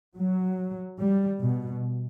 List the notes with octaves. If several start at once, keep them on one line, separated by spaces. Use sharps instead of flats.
F#3
G3
B2